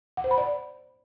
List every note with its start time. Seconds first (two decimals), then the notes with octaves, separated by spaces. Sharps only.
0.17 F#5
0.24 C5
0.31 B5
0.38 D5